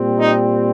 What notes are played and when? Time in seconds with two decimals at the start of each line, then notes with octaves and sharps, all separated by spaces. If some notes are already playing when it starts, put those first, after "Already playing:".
Already playing: A#2 G3 C4
0.20 D#4